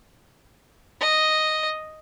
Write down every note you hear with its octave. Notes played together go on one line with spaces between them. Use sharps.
D#5